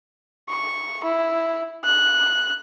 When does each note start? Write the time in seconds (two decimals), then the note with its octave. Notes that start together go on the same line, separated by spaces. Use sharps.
0.49 C#6
1.04 E4
1.84 F#6